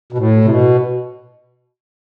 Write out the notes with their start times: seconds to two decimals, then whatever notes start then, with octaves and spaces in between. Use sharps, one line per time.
0.13 B2
0.18 A2
0.45 C3
0.49 B2